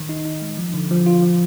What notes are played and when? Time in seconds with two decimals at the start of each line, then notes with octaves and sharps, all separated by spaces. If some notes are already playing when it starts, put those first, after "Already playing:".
Already playing: D#3
0.09 D#4
0.25 D#4
0.42 G#3
0.58 F3
0.74 D3
0.91 F3
1.06 F4
1.22 F3